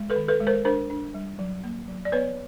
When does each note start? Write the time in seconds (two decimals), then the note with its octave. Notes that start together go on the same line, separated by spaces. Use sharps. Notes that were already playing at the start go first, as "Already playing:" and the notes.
Already playing: G#3
0.10 A4 B4
0.16 D#3
0.28 A4 B4
0.40 G#3
0.47 A#4 C5
0.65 D4 A#4 C5
0.90 D4
1.14 G3
1.39 F#3
1.64 A#3
1.88 F#3
2.05 D5
2.12 B3 B4 C#5